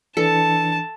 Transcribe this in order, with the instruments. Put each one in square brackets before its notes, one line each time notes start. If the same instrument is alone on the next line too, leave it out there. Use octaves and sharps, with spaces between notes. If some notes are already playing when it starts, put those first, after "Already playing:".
[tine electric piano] E3 D4 C#7 [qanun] A4 [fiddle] A5